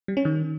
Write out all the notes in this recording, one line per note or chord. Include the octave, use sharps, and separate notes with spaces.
G3
C#4
D#3